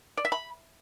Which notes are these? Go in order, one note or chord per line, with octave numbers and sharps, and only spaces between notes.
D5
E5
B5